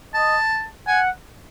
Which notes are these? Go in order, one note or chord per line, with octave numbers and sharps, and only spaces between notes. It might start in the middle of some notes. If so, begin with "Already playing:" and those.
D#5 A5
F#5 G#5